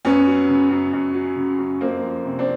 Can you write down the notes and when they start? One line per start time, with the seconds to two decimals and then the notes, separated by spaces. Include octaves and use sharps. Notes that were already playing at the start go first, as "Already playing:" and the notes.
0.05 F#2 B3 C#4
0.26 F#3
0.48 C#3
0.70 F#2
0.93 F#2
1.14 F#3
1.36 C#3
1.59 F#2
1.80 F2 A#3 C4
2.03 F3
2.25 C3
2.39 C4 D4